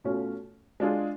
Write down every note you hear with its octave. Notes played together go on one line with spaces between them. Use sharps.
B2 A3 C#4 F4
G#3 D4 F4 G#4